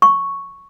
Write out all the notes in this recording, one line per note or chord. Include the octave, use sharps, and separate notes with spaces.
C#6